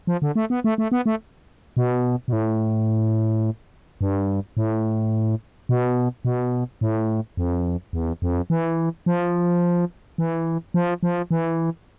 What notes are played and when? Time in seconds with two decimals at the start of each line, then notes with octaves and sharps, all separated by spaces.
0.07 F3
0.22 D3
0.35 A3
0.50 B3
0.64 A3
0.78 A3
0.92 B3
1.06 A3
1.77 B2
2.28 B2
2.33 A2
4.01 G2
4.57 A2
5.69 B2
6.25 B2
6.81 A2
7.37 F2
7.93 E2
8.22 F2
8.50 E3
9.06 F3
10.18 E3
10.74 F3
11.03 F3
11.31 E3